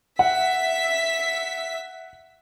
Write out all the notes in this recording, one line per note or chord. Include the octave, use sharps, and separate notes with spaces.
E5 F#5 B6